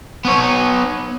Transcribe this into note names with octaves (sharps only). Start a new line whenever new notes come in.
B3 C#5